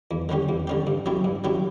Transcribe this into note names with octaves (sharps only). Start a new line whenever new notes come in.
E2
D3 G3 C#4 G4
E2
D3 G3 C#4 G4
G2
F#3 C#4 E4 G4
G2
F#3 C#4 E4 G4